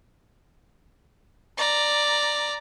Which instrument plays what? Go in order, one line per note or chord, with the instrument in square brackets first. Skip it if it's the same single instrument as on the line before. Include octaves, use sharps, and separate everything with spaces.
[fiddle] D5 A#5